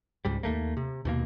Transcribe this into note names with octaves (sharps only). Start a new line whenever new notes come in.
C#2 G#2 G3
D#2 A3 A#3
C3
D#2 B2 A#3